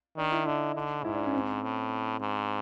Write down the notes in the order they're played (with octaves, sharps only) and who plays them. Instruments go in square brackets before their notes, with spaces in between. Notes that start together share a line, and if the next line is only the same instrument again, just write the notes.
[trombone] D#3 [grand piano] D4
[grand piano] E4
[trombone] D3 [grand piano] D#4
[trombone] D3
[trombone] G#2 [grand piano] E4
[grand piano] D4
C#4
C4
[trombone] A2
G#2